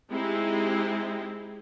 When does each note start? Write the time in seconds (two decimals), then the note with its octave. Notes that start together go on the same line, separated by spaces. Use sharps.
0.12 G#3 C4 D#4 E4 G4